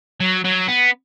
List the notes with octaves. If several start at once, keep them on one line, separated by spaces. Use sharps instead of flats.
F#3
F#3
B3